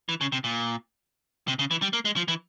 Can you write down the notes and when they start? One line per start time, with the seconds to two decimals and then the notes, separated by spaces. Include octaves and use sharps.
0.09 E3
0.21 C#3
0.32 C3
0.44 A#2
1.48 C3
1.59 C#3
1.71 E3
1.82 G3
1.93 A#3
2.05 G#3
2.16 F3
2.28 E3